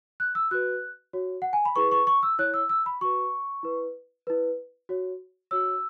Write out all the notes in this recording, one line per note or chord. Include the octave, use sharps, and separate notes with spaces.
F#6
E6
F#4 B4 F#6
F#4 C#5
F#5
G#5
B5
E4 G#4 B4 C#6
C#6
C#6
E6
E4 C#5 F#6
E6
E6
B5
F#4 B4 C#6
E4 B4
E4 B4
F#4 C#5
F#4 C#5 E6